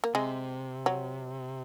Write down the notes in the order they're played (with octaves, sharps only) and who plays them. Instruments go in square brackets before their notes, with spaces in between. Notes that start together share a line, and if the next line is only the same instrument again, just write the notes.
[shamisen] A#3
[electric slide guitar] C3 [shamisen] G#3
[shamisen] F#3